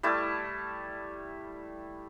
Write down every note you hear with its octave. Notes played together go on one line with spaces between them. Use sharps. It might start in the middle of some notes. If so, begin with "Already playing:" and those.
G3 A3 E4 A5